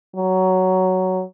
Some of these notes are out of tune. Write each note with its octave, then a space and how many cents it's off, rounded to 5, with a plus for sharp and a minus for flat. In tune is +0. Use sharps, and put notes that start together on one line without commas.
F#3 +10